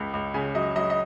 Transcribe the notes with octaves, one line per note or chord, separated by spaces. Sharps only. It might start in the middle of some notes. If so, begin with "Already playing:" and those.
Already playing: C#2 C#3
C#2
C#3 G#5
F#3 D#5
F#3 D#5
D#5